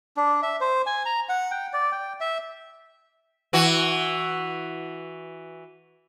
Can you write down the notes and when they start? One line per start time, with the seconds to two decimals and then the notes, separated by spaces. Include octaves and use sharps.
0.17 D4
0.43 E5
0.61 C5
0.86 G#5
1.05 A#5
1.29 F#5
1.51 G5
1.73 D5
1.92 G5
2.21 E5
3.53 E3 F#4